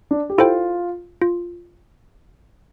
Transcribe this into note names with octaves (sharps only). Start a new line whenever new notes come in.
D4
G4
E4 F4 A4 C5 G5
F4